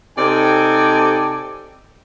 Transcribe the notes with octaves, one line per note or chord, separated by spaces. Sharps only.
C3 D#4 A4 D5 G5 G#5